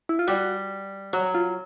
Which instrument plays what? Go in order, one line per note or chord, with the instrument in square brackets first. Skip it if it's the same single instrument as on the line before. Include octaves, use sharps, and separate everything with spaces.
[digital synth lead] E4
F4
[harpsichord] G3 [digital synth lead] F#4
[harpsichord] F#3 [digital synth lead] F#4
[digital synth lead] F4